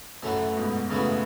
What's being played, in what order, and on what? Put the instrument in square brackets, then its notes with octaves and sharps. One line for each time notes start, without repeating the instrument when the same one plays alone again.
[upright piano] F#2 A2 [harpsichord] E3 A3 C#4 F#4 B4
[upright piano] G#2 B2
[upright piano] A2 C#3 [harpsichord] E3 A3 C#4 F#4 B4